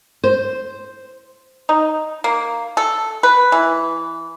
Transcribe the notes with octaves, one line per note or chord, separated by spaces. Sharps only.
C5
D#4
A#3
A4
B4
E3